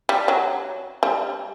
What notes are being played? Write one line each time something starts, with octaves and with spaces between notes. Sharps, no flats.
G3
F#3
G3